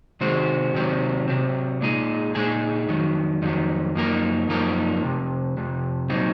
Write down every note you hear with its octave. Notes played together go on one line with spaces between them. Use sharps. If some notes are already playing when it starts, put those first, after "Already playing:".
C3 D#3 G#3 C4 F#4
C3 D#3 F#3 C4
C3 D#3 F#3 C4
A#2 G#3 D#4 G#4
A#2 G#3 D#4 G#4
F2 D#3 F#3
F2 D#3 F#3
F#2 F3 A#3 D#4 A#4
F#2 F3 A#3 D#4 A#4
F2 C3
F2 C3
A#2 F#3 C4 D#4